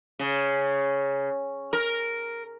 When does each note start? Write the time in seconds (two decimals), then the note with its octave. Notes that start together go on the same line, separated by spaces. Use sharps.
0.19 C#3
1.73 A#4